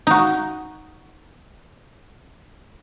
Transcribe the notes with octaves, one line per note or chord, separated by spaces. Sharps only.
D#4 F#4